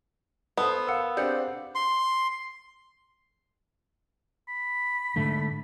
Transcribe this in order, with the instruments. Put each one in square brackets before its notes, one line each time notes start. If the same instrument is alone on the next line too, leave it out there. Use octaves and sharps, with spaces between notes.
[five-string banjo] B3 [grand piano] A4 C5 [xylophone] D#6
[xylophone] A#4 C#7 [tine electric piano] F5 F#5 E6
[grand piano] C4 D4 G4 [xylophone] G#4 G6 C#7
[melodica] C6
[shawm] B5
[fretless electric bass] G#2 D3 A3